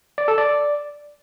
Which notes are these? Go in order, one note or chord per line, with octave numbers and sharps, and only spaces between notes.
D5
A4
D5